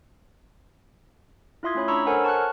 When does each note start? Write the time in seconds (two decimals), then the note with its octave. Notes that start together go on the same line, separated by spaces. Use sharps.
1.63 E4 F4 E5 C6 D#6 G#6
1.75 A3 C#4 C#5 B5
1.88 D4 A#5 B5 C#6 E6
2.06 A4 A#4 C5 C#5 F#5 G#5
2.24 A5 C#6 F6 F#6
2.37 F6